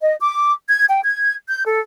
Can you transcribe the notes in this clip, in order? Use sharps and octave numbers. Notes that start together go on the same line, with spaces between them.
D#5
D6
G#6
G5
G#6
G6
A4